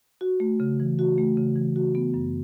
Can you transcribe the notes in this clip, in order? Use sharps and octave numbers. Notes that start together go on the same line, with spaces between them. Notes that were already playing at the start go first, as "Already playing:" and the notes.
F#4
A3
C#3
E3
F#4
A3
C#3
E3
F#4
B3
F#2